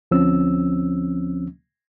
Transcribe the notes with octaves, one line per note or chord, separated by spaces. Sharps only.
D2 F3 C4 C#4 E6